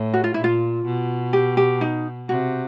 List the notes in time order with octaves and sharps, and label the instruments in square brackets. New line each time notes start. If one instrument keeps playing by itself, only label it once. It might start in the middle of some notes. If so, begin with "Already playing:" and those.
Already playing: [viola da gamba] A2
[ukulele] F#4
F4
[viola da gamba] A#2 [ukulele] E4
[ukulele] F4
[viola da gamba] B2
[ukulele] G4
G4
D#4
[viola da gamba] C3 [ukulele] F#4